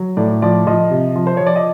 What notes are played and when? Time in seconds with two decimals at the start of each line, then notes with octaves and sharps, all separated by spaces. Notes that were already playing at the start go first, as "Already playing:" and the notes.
Already playing: F#3
0.17 A2 D5
0.42 F3 D5
0.67 F3 D#5
0.91 C3
1.15 F3
1.27 C5
1.37 F3 C#5
1.47 D5
1.56 D#5